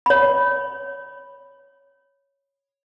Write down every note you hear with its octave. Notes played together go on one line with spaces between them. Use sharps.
C#5 B5